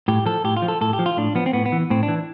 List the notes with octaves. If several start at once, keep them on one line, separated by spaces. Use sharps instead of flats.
A2 G4
F3 A4
A2 G4
F4
F3
A4
A2 A4
G4
F3
F4
A2 D4
F3 B3
C4
A2 B3
B3
E3
A2 C4
D4
E3